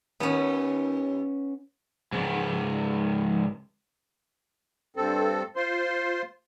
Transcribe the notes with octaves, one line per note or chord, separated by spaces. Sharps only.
D#2 B3 C#4
C#2 G#2
G2 C4 A4
F4 C5 C6